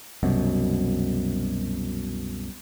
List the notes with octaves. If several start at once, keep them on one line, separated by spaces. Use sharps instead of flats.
C2 F#2 B2